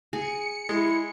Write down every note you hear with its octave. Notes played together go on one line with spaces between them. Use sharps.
G#4 C#7
G#3 E4